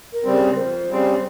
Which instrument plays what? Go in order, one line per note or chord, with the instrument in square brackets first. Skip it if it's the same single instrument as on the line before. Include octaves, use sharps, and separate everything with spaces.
[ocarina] A#4
[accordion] C#3 G3 C4
[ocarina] A#4
[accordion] F2 [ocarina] C5
[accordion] C#3 G3 C4